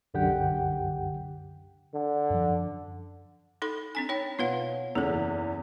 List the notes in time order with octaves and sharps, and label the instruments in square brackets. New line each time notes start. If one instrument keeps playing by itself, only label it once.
[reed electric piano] C2 F#2 D3 G4 F#5 G5
[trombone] D3
[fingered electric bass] F#2 F3
[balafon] D#4 A4 C6
C4 D4 G#5
[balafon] D#4 G5 [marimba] C#5
[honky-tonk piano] B2 [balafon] F4 B4 F5 [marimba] C#5 F#5
[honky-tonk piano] E2 C#3 [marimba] A#3 [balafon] G#4 A4
[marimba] F#2 E3